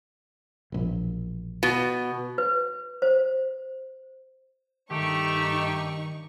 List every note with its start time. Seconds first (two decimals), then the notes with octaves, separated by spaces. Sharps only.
0.72 E1 A#1
1.63 B2
2.38 B4
3.02 C5
4.91 G2 D#3 A3 D#4 G4 C#6